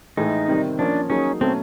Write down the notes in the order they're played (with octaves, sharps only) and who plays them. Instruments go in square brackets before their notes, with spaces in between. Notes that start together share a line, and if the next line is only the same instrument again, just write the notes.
[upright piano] A2 E3 G#3 [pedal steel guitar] D#4
[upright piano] C3 D#3 G3 C4
[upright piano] F3 A#3 C#4 [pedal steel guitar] D4
[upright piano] F#3 A#3 D#4 G#4 [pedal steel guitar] C#4
[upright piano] B2 F#3 A3 C#4 [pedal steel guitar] C4